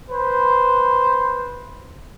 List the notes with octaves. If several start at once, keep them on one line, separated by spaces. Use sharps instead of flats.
B4 C5